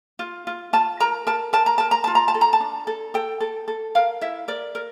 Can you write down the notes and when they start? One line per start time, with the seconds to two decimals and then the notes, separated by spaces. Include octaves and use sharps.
0.19 F4
0.47 F4
0.73 F4 A5
1.00 A#4 A#5
1.27 A#4 A5
1.53 A#4 A5
1.66 A#5
1.78 A#4 A5
1.91 A#5
2.04 F4 A5
2.15 A#5
2.28 A5
2.34 A4
2.41 A#5
2.53 A5
2.60 D4
2.87 A4
3.14 A4 G5
3.40 A4
3.68 A4
3.95 A#4 F5
4.21 E4 E5
4.48 A#4 D5
4.75 A#4